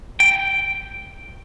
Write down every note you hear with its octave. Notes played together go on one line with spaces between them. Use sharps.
G5